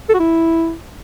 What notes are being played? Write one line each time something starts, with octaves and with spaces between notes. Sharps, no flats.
A4
F#4
E4